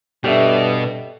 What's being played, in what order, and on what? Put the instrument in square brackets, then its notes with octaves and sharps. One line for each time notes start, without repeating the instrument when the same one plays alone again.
[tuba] G2 [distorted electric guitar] B2 [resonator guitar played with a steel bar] G4 E5 [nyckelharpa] A4 D5